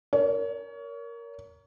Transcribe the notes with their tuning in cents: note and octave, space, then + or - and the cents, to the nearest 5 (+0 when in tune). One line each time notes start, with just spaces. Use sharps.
A#4 +0 C#5 +30